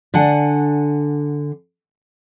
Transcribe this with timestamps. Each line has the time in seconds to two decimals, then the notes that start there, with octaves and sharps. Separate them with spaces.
0.14 D3 D4 F#5 G#5